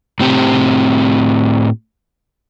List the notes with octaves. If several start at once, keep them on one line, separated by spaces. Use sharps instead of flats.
A2 C4 G4